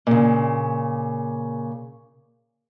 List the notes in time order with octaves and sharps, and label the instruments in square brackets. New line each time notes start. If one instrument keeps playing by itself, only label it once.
[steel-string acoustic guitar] A#2 C#3